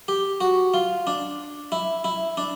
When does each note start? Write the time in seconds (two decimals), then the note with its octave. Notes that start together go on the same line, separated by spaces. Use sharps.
0.08 G4
0.41 F#4
0.74 F4
1.07 D4
1.72 E4
2.04 E4
2.37 D4